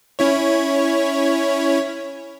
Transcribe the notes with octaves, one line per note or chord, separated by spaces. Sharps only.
C#4 E4 C#5